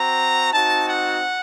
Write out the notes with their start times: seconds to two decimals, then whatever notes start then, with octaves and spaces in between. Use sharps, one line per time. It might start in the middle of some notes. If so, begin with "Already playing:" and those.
Already playing: C4 F#4 A#5
0.51 C4 D#4 F#4 A5
0.88 F#5